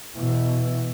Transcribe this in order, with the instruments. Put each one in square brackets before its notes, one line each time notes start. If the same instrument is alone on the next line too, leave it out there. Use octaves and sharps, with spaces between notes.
[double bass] B2 E3